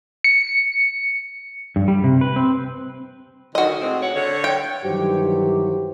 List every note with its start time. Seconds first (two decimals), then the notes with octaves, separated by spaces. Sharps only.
0.24 C#7
1.76 G2
1.88 G3
2.04 C3
2.21 B4
2.36 C4
3.55 D3 D#3 F#4 D#5
3.80 A2 G#3 C4
4.01 D2 C#5 F#5
4.14 D3 C#5
4.44 G5
4.85 G2 D#3 E3 F#3 G4 C5